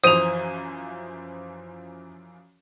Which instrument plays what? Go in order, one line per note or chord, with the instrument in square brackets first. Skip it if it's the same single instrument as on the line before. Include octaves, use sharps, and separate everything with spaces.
[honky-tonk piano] F#2 E3 F3 [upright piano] C5 D#7 [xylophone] D#6 F7